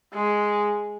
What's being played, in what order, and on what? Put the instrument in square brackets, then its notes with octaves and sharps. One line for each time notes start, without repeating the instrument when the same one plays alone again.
[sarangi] G#3